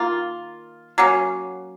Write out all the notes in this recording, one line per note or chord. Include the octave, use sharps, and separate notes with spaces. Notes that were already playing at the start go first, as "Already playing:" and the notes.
Already playing: D#3 A#3 F4
F#3 A#3 C#4